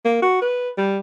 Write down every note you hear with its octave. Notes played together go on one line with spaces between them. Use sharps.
A#3
F#4
B4
G3